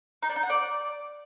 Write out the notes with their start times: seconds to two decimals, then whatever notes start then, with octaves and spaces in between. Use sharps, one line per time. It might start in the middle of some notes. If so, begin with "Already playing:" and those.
0.22 D#4
0.29 D4
0.36 D#4
0.43 F#5
0.50 D5